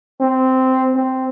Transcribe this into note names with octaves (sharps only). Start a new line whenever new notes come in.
C4
C4